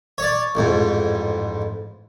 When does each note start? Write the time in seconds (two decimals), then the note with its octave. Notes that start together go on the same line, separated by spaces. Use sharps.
0.18 C#5 D5
0.55 A1 F2 G#2